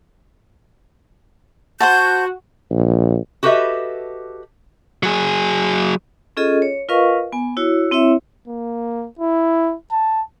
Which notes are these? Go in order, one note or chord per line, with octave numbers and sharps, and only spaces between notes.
F#4 C5 F#5 A5 G6
A#1
F#4 G4 A4 B4 D#5 E5
F#3 G#4
C#4 F4 G#4 A4 D#5
C#5
F4 A#4 B4 D#5 F5 C#6
B3 G#5
E4 F#4 C#5
C4 E4 C#5 E5
A#3
E4
A5